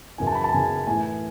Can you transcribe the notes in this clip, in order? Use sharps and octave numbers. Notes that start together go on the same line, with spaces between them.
F#2 C#3 E3 G#5
A5
B5
A5
F#2 C#3 E3 G#5
A2 E3 G#5